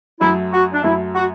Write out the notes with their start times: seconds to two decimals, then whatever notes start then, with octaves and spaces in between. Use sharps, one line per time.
0.21 F#2 F#3 A3 E4
0.53 F#4
0.73 D4
0.84 F#2 F#3 A3 E4
1.15 F#4